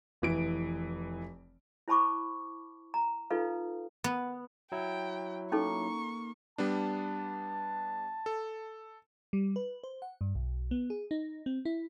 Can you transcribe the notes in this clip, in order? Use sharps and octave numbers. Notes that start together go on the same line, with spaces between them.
F1 E3 D7
E4 C5 A5 B5 C#6 D6
A#5
D#4 F4 A4 B4 F5
B3
F#3 E4 G5
A#3 C#4 D#4 A4 C#6
G3 B3 D4 A5
A4
G3
B4
C5
F#5
G2
B1
B3
G#4
D#4
C4
E4